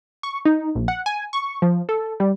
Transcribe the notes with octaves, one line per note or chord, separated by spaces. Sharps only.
C#6
D#4
A#1
F#5
G#5
C#6
F3
A4
G3